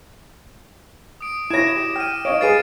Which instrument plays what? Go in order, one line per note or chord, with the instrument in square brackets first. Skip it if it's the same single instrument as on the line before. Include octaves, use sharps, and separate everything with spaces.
[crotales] D#6 D7
[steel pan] E4 C#5 [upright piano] G#6 A#6 [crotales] D7 E7
[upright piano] G4
[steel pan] G5 [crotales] F6 D#7
[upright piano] D#4 D#5 F5 [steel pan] C#5 [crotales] D7
[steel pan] G#4 B4 D#6 [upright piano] F5 G#5 [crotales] A6 C7 D#7